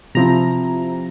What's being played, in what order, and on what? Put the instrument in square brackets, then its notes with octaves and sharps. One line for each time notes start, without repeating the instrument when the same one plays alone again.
[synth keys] C3 F3 C4 E4 A#5